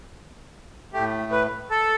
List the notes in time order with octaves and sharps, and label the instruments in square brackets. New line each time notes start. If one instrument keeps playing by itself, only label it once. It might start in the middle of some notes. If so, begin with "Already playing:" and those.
[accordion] A2 A3 G4
B4
A4